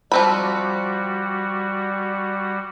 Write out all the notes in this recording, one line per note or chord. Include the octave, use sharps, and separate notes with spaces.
F3 G3 C4 F#4 B5